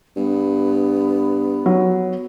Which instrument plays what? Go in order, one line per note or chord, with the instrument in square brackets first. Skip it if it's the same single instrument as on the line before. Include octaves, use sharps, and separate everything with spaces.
[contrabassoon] G2 [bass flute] B3
[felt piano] F#3